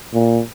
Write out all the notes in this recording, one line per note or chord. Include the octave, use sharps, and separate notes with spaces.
A#2